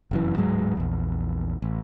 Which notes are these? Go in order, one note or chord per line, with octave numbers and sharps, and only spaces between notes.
F1 F#2 E3
D1 G#2 F#3 G#3
A#1 E2
A1